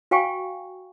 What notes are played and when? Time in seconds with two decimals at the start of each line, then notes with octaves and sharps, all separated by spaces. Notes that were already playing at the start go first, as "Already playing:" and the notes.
0.11 F#4 F5 G5 G#5 C#6